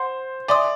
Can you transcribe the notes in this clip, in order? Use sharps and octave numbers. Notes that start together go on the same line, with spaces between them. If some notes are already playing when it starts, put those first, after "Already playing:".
Already playing: C5 F#5 C6
D5 E5 G#5 C6 D#6